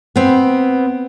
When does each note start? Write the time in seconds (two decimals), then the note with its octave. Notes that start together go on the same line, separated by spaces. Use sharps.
0.16 B3 C4